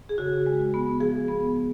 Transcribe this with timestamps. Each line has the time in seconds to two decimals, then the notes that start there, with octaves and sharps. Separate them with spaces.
0.09 G#4
0.18 C#3 F#4
0.46 G#3
0.74 B3
1.00 F3 G#4
1.29 B3